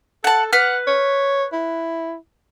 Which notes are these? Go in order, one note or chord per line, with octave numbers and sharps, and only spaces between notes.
A4 F#5 A5
B4 F#5 F6
C#5
E4